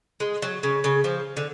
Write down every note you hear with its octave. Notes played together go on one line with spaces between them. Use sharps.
G#3
F#3
C#3
C#3
F3
D3